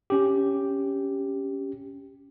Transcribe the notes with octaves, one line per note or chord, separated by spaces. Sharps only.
C#4 G4